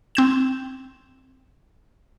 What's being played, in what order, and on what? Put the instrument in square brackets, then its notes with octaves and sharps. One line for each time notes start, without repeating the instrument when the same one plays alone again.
[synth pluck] C4 G6 E7